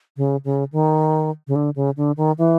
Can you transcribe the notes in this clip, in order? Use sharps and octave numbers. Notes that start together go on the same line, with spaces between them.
C#3
C#3
D#3
C#3
D3
C#3
D3
D#3
E3